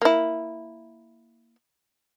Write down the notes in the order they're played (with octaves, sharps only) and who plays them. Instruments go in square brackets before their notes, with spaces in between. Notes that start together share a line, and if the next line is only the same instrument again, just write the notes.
[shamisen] A#3 E4